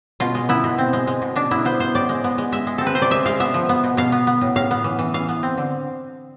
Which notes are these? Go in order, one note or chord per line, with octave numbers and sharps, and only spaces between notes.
B2 F4
G#3
B3 E4
B2
C4
G#3
G#3
B2
B2 D4
B3 E4
B3 C5
B3 C5
A2 D5
G#3
B3
G#3
G#3 E5
G#3
C4 A4
B4
C3 C5
D5
G#3 E5
G#3 F5
B3 E5
F3
B3
B2
B2 F5
B3
B3
A2
A2 F5
B3
E3
E3
E3 F5
B3
C4
D3